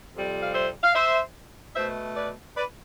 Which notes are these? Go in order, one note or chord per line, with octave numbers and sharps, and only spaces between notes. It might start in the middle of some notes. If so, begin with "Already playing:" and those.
F2 C3 G3
F5
C5 E5
F5
C5 E5
B2 A3 C5 E5
B4 D5
B4 D5